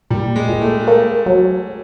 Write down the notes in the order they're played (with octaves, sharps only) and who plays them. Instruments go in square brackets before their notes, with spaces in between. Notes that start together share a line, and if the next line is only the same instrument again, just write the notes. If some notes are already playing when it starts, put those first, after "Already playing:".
[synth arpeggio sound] A#2 [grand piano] G3
[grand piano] G#3
[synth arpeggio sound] A#2
[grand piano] A3
G#3
[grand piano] A3 [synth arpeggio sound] A#3
[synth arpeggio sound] F#3